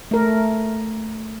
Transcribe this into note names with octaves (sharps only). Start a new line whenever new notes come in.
A3 A#4